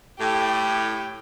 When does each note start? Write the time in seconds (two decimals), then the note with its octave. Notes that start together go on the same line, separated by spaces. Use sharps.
0.20 A2 G4 G5